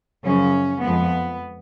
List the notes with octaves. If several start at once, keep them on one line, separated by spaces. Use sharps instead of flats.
F#2 C#3 F3 C#4
F2 F3 G#3 B3